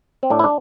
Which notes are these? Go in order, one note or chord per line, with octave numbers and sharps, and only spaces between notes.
C4
A2 D4
E4
D4